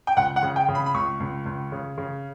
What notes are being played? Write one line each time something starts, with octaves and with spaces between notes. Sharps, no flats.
G5
C#2 F#5
F#5
C#3
G5
C#3
B5
B5
C#2 C#6
C#2
C#2
C#3
C#3